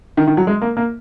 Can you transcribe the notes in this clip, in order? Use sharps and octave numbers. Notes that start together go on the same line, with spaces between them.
D#3
D#3
F#3
G#3
A#3
A#3